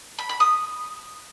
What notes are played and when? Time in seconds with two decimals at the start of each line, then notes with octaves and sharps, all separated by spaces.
0.19 B5
0.29 B5
0.40 D#6